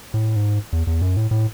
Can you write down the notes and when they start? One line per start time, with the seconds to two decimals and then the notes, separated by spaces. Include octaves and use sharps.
0.14 A2
0.36 G#2
0.73 E2
0.87 E2
1.02 F#2
1.17 A2
1.31 A2